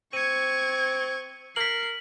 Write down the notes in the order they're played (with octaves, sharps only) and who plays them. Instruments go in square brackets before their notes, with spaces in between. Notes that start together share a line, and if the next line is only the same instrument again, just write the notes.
[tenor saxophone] C4 [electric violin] C#6 G#6 [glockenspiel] C#7 D#7
[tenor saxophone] A#4 [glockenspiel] B6 F#7 [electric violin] C7